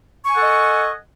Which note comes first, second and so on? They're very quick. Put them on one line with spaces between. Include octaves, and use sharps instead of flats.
C#6 G#5 F#5 A4 D#5